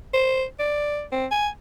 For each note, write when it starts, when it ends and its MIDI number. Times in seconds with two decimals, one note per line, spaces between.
0.14 0.45 72
0.59 1.04 74
1.12 1.26 60
1.31 1.48 80